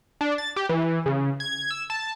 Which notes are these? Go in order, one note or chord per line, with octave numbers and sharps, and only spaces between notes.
D4
A6
G4
E3
C#3
G#6
E6
A5